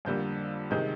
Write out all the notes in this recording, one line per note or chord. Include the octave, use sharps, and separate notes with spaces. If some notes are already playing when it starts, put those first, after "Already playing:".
F2 D3 G3 A#3 G6
C3 D#3 G#3 G6